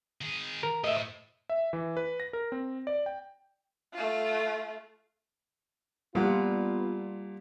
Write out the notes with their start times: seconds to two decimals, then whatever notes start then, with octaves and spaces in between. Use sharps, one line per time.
0.21 D#3 G#4
0.63 A#4
0.84 A2 D#5 E5
1.50 E5
1.73 E3
1.97 B4
2.20 A#6
2.33 A#4
2.52 C4
2.87 D5
3.06 G5
3.93 A3 F4
6.15 A#2 F3 G3 B3 F4 F#5